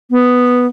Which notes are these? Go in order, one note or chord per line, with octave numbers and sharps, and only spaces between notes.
B3